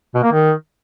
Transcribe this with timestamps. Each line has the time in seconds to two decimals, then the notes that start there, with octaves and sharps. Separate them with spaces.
0.15 B2
0.23 A#3
0.32 D#3